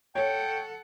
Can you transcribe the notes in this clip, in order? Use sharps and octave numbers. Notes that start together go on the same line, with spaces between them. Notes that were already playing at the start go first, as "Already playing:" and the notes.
A4 C#5 F#5 G5